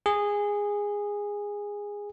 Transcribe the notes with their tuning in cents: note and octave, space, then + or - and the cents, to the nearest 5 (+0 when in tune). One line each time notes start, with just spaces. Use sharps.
G#4 -15